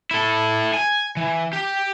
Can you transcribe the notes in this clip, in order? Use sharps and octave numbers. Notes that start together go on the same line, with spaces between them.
E4 A4
G#5
E3
G4